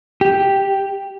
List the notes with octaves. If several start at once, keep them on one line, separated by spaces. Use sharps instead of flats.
G4